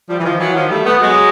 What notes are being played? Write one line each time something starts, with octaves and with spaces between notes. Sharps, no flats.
F3 G3
E3
D#3 F3
E3 F#3
D#3 F3
G3 A3
A3 B3
F#3 G#3